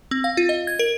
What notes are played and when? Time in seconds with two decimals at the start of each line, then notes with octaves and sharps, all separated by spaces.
0.11 C4
0.24 F5
0.37 F4
0.49 D#5
0.67 G#6
0.79 A#4